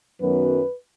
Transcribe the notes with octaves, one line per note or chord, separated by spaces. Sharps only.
F#2 D#3 F#3 B3 B4